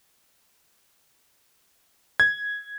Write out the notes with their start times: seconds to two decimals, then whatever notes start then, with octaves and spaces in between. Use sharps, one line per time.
2.20 G#6